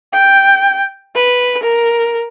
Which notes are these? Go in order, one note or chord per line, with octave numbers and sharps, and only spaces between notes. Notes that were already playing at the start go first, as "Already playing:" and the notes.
G5
B4
A#4